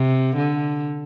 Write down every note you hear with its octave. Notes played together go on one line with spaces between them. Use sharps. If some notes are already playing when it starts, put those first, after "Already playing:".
Already playing: C3
D3